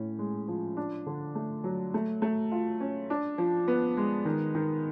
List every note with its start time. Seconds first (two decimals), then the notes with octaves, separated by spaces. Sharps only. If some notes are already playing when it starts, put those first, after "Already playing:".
Already playing: A2 C#4
0.19 G#3
0.48 F3
0.77 D4
1.06 D3
1.35 A3
1.64 F#3
1.94 A3
2.22 A3
2.52 F4
2.80 C#4
3.10 D4
3.38 F3
3.68 B3
3.97 G#3
4.25 D#3
4.55 D#3